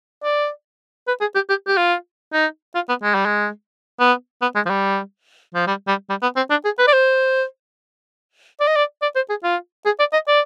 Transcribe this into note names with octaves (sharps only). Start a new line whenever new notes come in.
D5
B4
G#4
G4
G4
G4
F4
D#4
F4
B3
G#3
G3
G#3
B3
B3
G#3
F3
G3
F3
G3
G3
G3
B3
C4
D4
G#4
B4
D5
C5
D5
D#5
D5
D5
C5
G#4
F4
G#4
D5
D#5
D5